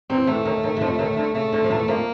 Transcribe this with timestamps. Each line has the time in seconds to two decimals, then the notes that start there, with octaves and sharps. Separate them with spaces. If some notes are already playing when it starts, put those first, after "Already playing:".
0.09 E2 E3 C4
0.27 E2 E3 A3
0.45 D#2 D#3
0.63 D#2 D#3
0.77 E3
0.81 F2 F3
0.99 D#2 D#3
1.17 D2 D3
1.34 C#3 A3
1.52 D2 D3
1.64 F3
1.70 E2 E3
1.88 F2 F3 A#3